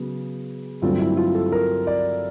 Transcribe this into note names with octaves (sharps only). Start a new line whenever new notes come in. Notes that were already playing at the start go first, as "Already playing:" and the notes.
Already playing: C#3 F#3 B3
G2 D3 F#3 A3 C4 F4
E4
F4
A4
A#4
D5